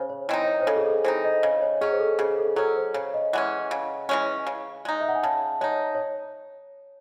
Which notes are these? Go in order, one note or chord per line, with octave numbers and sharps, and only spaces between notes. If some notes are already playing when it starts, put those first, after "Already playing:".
Already playing: C#3 C5
C#5
E3 C4 D#4 D#5
D#5
C#5
C5
C#3 A4
G#4
A4
E3 C4 D#4 C5
D#5
C#3 D#5
C#5
F#3 C#4 G#4
C5
A4
C#3 G#4
A4
F#3 C#4 A4
C5
C#3 C#5
D#5
E3 G#3 C#4 F#5
C#3
E3 G#3 C#4
C#3
G#3 D#4
E5
F#5
G#5
C#3 A5
G#3 D#4 C#5
C#5